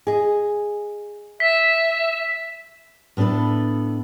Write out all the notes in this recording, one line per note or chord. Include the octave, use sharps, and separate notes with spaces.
G#4 D#5
E5 B6
A2 B3 D4 A4 B4